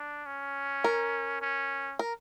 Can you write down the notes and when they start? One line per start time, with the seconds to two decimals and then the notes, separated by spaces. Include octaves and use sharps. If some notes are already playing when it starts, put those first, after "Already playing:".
Already playing: D4
0.26 C#4
0.84 A#4
1.42 C#4
1.99 A#4